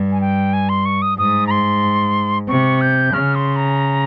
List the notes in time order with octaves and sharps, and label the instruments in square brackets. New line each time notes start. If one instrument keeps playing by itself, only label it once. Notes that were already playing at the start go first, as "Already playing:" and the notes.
Already playing: [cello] G2
[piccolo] G#5
G5
G#5
C6
C#6
D#6
[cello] G#2 [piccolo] D#6
[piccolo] A#5
C6
[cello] C3 [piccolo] C#6
[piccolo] G6
[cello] C#3 [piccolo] F6
[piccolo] C6
A#5